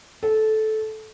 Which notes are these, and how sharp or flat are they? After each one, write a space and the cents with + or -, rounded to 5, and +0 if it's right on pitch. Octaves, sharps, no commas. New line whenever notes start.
A4 -15